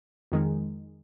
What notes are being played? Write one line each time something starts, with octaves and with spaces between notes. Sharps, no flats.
F2 D#3 G#3